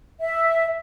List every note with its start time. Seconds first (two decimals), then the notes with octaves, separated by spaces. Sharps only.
0.21 E5